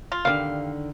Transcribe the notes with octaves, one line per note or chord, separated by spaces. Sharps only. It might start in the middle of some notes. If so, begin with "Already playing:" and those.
F4
D3 D#3 G3 F5